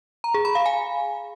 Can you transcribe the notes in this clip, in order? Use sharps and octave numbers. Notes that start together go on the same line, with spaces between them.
A#5
G#4
B5
F5
G#5